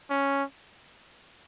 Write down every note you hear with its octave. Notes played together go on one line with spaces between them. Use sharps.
C#4